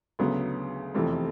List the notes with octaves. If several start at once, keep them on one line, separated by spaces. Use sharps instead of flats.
D2 C#3 F#3 B3
F1 E2 C3 F3 A3